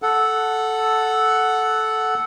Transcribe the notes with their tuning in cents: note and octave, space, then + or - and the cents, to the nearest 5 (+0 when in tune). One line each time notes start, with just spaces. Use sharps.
A4 -5 F#5 +0